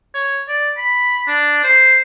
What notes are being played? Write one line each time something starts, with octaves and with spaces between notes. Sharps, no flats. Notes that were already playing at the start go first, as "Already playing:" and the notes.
C#5
D5
B5
D4
C5